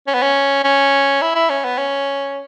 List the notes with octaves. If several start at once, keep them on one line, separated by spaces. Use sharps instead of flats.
C#4
B3
C#4
C#4
E4
E4
C#4
B3
C#4